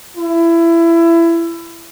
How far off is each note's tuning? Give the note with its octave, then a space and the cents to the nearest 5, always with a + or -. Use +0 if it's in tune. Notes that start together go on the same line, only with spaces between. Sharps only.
E4 +25